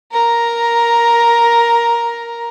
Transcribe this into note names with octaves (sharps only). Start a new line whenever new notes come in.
A#4 A#5